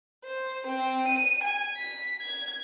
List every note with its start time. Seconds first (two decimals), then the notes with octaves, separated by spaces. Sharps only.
0.25 C5
0.67 C4
1.08 D#7
1.44 G#5
1.77 B6
2.22 G#6